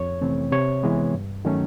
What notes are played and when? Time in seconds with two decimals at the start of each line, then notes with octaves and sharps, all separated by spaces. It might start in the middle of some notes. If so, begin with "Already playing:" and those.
Already playing: F2 C#5
0.21 C3 E3 A3 C4
0.52 C3 C#5
0.83 E3 G#3 B3
1.13 G2
1.45 D#3 F#3 A3 C#4